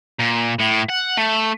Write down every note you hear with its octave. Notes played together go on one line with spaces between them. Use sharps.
A#2
A2
F#5
A3